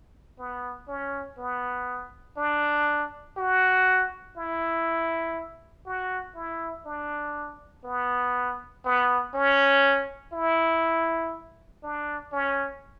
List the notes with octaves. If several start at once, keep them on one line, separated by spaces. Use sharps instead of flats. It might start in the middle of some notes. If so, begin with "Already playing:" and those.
B3
C#4
B3
D4
F#4
E4
F#4
E4
D4
B3
B3
C#4
E4
D4
C#4